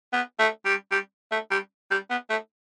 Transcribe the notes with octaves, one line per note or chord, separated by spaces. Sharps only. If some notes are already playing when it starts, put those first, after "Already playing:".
B3
A3
G3
G3
A3
G3
G3
B3
A3